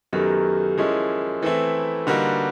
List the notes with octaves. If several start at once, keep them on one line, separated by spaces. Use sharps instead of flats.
F#2 D#3 F#3 B3 G4 A4
F3 G#3 C#4 E4 G#4 A#4
E3 A3 C4 E4 A4 B4
D3 G3 A#3 D#4 F#4